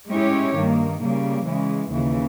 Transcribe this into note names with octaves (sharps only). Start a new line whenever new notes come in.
G#3 C#4 E4 G4 C#5
G2 D#3 A#3
C#3 G3 A#3
C#3 E3 G#3
D#2 C#3 E3